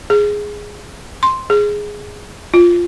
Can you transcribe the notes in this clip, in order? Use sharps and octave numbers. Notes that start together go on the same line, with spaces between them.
G#4
C6
G#4
F4